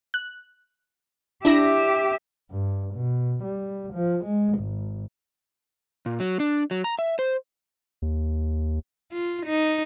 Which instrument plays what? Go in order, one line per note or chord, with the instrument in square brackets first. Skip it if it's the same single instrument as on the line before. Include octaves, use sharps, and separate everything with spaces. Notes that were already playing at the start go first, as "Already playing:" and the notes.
[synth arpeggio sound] F#6
[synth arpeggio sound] D4 E4 A#6 [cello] G4 E5
[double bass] G2
B2
G3
F3
G#3
G#1
[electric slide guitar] A#2
F#3
D4
F#3
A#5
E5
C5
[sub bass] D#2
[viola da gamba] F4
D#4